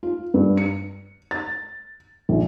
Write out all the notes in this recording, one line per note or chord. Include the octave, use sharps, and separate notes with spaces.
F4
G2
C#7
A6
A#1